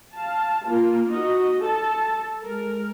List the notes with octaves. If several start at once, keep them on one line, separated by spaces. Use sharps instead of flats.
F5 A5
A#3 F4
D#4 F#4 D#5
A4 A5
G#3 A#4